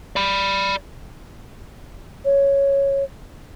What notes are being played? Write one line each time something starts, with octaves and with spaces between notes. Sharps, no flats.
D5 B5
C#5